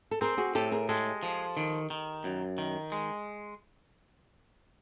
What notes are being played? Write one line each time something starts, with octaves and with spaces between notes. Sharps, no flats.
A4
C4 G#4 A#4
F#4 G#4
A2 G4 A4
G#4 A#4
G#3 G4 A4
F3
D#3
D#3
F#2
D#3
G#3